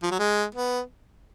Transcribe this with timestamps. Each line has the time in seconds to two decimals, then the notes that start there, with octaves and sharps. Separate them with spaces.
0.03 F3
0.11 F#3
0.19 G#3
0.55 B3